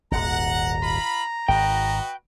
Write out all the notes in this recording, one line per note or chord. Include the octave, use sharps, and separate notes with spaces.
D#1 G#1 D#2 F#5 A#5
F4 B5
G#1 F#4 B4 D#5 G5